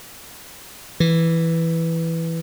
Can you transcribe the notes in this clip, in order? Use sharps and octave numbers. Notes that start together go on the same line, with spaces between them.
E3